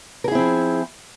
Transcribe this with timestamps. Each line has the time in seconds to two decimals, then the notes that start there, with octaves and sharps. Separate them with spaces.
0.24 A#4
0.28 G#4
0.31 E4
0.35 C4
0.39 F3